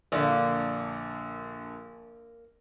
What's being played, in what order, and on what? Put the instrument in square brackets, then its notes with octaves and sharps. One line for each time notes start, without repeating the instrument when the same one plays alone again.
[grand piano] A#1 D3 [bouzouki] A#3 D5